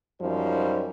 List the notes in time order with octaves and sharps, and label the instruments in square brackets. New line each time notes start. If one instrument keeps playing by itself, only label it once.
[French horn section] F#2 F3 G3 D#4 C5